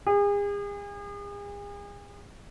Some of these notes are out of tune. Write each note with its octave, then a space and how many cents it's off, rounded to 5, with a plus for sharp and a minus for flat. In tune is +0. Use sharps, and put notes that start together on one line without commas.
G#4 -40